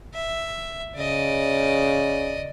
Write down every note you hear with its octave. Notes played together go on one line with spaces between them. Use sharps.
E5
C#3 D5 D#5